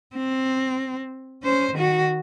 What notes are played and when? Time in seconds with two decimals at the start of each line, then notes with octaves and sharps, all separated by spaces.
0.15 C4
1.43 C#4 C5
1.74 D#3 F#4